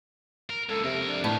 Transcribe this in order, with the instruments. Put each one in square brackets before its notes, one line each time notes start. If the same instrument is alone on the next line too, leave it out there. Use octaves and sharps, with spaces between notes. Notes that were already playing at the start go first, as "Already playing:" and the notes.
[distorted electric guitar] A#4
[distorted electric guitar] C#2 A#2 [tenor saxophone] A4
[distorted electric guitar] F2 A#4 [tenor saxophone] C3
[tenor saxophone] D4
[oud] A2 [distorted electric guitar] B3 A#4